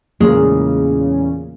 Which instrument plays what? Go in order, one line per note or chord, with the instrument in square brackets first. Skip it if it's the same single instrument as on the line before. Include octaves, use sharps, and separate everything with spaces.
[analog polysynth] E2 A#2 C#3 [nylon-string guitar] G#3 [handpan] A#3